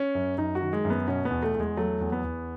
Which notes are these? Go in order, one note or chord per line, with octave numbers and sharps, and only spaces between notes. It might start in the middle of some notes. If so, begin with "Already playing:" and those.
Already playing: C#4
F#2
F#2 D#4
F#4
D#3
G#3
F#2
B3
B2 C#4
B3
E2
A3
E2
G#3
F#3 A3
E2
B3
E2